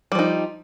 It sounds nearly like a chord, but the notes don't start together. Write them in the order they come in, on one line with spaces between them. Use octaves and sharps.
G3 F3 D#4